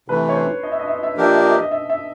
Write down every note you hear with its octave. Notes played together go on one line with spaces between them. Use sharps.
C3 E3 A3 B4
C#5
C5
D#5
E5
D#5
E5
D#5
E5
D#5
F3 A#3 D4 G4 A#4 E5
D#5
E5
D#5
E5
D#5
E5
E5